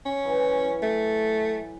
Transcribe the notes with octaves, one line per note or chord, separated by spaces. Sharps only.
C#4
E3 F#3
A3